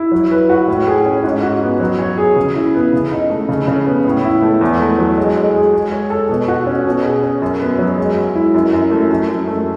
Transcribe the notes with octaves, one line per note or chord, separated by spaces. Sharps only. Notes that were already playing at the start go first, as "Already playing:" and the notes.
Already playing: E4
F#3
B4
F#4
A2
G#4
C#4
G#2
F#4
B3
F#3
C#5
G#4
C#3
E4
B3
C#3
D#4
A3
C#3
C#3
B3
A2
E4
A3
E2
A3
F#3
G#3
G#3
G#4
G#3
C#5
A4
B2
F#4
C#4
B2
G#4
C#4
F#2
B3
F#3
G#3
G#3
E4
F#2
F#2
A3
F#2
F#2
A3